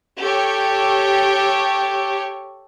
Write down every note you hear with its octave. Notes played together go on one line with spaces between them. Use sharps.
G4 A4 C#5